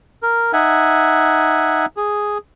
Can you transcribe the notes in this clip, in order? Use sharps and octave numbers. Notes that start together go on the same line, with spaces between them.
A#4
D#4 E5 F#5 G#5
G#4